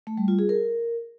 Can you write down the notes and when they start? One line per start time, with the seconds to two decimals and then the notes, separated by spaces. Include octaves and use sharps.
0.07 A3
0.17 G3
0.28 F4
0.39 G#4
0.49 A#4